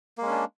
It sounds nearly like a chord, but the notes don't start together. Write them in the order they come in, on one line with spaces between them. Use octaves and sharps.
A#3 G#3 C#4 D4